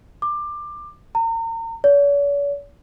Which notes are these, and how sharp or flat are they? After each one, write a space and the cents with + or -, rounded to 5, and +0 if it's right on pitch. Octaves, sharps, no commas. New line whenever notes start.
D6 +20
A#5 -40
C#5 +45